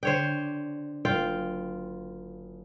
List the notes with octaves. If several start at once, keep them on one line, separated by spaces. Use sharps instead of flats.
D3 D4 C5 C#5 G5
F#1 F4 G5 C7